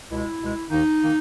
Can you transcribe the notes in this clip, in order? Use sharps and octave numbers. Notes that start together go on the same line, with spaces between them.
C#2 B2 G#3 E4
C#2 B2 G#3
D#2 D#3 A#3 D#4
D#3 A#3